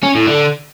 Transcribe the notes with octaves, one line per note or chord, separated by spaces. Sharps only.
C#4
A2
D3